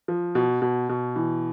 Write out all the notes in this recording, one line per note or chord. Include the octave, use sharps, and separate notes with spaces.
F3
B2
B2
B2
E3